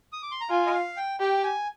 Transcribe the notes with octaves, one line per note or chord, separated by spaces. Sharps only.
D#6
D6
C6
A#5
F4 G#5
D#5
F5
G5
G4 G5
G#5